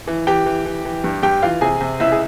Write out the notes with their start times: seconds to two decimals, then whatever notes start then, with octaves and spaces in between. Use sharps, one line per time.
0.07 E3
0.27 E3 G4 G5
0.46 E3
0.65 E3
0.85 E3
1.04 G2
1.23 G2 G4 G5
1.42 E3 F4 F5
1.61 C3 G#4 G#5
1.81 C3
2.00 C#2 E4 E5
2.12 G#4